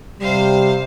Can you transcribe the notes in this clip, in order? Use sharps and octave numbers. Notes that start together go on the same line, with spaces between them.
C3 G3 C5 F5